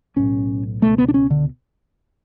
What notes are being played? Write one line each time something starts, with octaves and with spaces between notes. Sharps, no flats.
B1 A2 C#4
C#2 B2 A3
B3
D4
C#4
D3